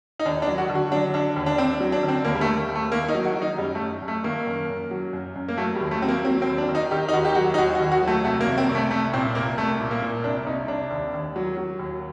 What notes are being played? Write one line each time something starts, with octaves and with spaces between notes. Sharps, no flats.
D#4
D#2 D4
D4
F#3
F#4
D3
F#4
F#3 D4
D3 D4
D#2
D4
D#2 C4
F#3
D4
D3
C4
D#2 A#3
G3
A3
D#2
D#2
A3
D#3 A#3
D#4
F#3
F#4
F#3
D#4
F#2 G3
A3
F#2
F#2
A3
D#3 A#3
F#2
F#2
F#3
F#2
F#2
A#3
F#3 A3
G3
D#2
A3
F#3 C4
A#3
F#3 C4
C4
D#2
D4
D#3
D#4
D#3 G4
D#4
D#2 F#4
G4
F#3 F#4
D#4
D#2 F#4
F#4
D#2
F#4
F#3 A3
C2 A3
A#3
C2
C4
C2
A3
C2 A3
A#2 C4
C2 A#3
C2 A3
A#2
A#3
A#2
C2 D4
C2 D#4
C2 D4
D#2
D#2
F#3
F#3
D#2